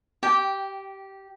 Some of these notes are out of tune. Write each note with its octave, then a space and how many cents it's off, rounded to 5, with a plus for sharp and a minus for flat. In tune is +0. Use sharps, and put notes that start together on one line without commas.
G4 -15 G5 +0